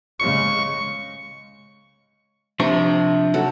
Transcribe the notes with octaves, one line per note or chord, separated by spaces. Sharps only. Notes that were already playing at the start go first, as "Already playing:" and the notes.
C#3 G#3 C#6
C3 F3 D4 G5 A#5 C#6
F#3 A4